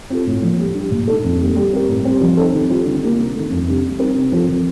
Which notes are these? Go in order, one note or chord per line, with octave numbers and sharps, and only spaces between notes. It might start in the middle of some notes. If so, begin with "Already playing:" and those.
C4 F4 A4
A2
F3 A#3
G3
D4 G4
A#2
A3 D#4 A4
F2
D#3 G3 A#3
G3
C4 G4 A#4
A2
G3 C4
F3
C4 D#4 A4
D#3
G3 C4 F4
D3
G3 A#3
C3
D#3 A3
F2
C3 G3 D4
G3
C4 D#4 A#4
C3
F3 C4 F4 A4
F3